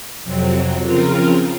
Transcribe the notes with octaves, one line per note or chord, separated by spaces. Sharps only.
F2 C3 F#3 C4
C#3 F3 C4 F4 A#4